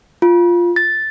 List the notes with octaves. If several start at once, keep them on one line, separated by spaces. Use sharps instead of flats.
F4
A6